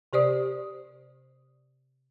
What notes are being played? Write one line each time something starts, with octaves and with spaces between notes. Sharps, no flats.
C3 G4 C5 D5 D#6